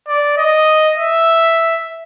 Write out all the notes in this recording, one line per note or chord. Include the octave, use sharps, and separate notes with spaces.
D5
D#5
E5